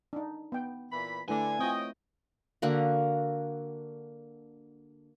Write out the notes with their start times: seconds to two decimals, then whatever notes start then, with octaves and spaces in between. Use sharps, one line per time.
0.13 D4 D#4
0.52 B3 G5
0.92 A#2 E3 B5
1.28 D3 A3 E4 B4 G#5
1.59 C4 F4 C#5 D#5 G5
2.62 D3 A#3 F#4